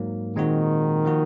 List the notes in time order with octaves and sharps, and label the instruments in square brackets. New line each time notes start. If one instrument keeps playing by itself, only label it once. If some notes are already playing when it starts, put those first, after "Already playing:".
Already playing: [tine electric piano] G#2 F#3 A#3
[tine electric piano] A#2 G#3 C4 F#4 [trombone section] D#3
[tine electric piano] F3 A#3 D#4 F#4